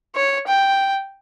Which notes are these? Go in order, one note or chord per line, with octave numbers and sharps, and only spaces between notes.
C#5
G5